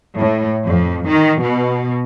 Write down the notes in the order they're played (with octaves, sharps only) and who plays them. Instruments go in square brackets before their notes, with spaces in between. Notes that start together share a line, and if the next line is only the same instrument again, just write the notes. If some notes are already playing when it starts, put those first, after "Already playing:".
[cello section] A2
F2
D#3
B2